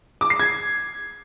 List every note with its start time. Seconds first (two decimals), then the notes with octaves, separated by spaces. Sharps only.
0.21 D6
0.30 C7
0.40 G#6